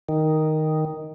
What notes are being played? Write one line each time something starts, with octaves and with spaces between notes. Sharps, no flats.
D#3